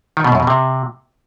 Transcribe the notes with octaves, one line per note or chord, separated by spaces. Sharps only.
D#3
B2
F#2
B2
C3